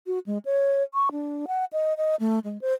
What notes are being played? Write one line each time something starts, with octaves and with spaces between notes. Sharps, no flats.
F#4
G#3
C#5
C#6
D4
F#5
D#5
D#5
A3
G#3
C5